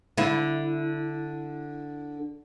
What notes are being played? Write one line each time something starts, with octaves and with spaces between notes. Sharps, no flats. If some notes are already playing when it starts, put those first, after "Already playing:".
D3 E4